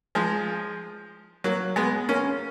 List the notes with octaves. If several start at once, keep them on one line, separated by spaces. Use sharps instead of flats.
F3 G#3
F#3 A#3
G#3 B3
A#3 C#4